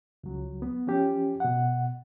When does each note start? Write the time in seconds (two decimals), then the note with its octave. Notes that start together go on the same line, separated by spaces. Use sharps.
0.24 C#2 F#3
0.62 B3
0.87 F3 C#4 G4
1.40 B2 F#5